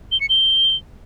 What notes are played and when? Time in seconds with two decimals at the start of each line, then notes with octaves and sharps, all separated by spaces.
0.12 G7
0.21 C#7
0.29 G7